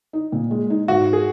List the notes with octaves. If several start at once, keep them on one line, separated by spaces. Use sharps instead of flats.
D#4
A#2
G#3
D#4
G#2 F#4
G#4